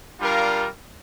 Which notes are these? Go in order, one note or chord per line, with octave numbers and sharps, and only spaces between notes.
G3 D4 F4 A#4 F5